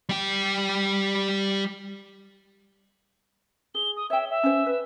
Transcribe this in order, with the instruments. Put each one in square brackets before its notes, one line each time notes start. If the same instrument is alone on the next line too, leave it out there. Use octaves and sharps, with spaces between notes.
[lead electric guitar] G3 G5
[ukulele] G#4 [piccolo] G7
[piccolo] D#6
[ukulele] C#5 G5 [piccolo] E5
[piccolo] E5
[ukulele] C#4 C5
B4